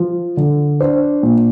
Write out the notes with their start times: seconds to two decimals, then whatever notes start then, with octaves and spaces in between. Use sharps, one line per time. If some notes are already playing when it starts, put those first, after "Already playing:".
Already playing: F3
0.37 D3
0.80 D4 C5
1.23 A#2